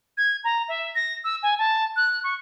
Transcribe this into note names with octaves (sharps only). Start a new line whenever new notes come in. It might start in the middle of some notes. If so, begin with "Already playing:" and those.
G#6
A#5
E5
A#6
E6
G#5
A5
F#6
C#6